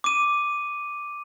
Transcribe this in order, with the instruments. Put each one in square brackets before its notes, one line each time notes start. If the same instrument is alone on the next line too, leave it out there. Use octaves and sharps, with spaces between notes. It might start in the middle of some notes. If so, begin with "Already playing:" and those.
[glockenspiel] D6 D#7